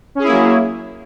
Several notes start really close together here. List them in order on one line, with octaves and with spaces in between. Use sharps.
C#4 G#4 E4 A#3 F#3